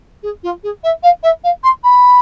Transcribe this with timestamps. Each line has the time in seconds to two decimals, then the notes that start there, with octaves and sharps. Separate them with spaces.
0.23 G#4
0.43 F4
0.63 G#4
0.83 E5
1.03 F5
1.23 E5
1.43 F5
1.63 C6
1.83 B5